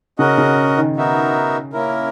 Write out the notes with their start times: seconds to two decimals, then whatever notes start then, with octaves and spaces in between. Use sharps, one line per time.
0.19 C#3 C#4 F#4 A#4 D#5 F#5
0.38 C#3
0.77 D#3
0.96 B3 D#4 F#4 A#4 E5
1.73 A#3 C#4 E4 A#4